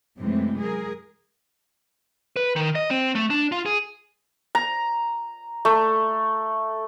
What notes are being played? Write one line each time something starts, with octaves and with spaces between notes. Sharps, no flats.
F#2 C3 E3 G#3 A3 C4
G#4 A#4
B4
D#3
D#5
C4
A3
D4
F4
G#4
A#5
A3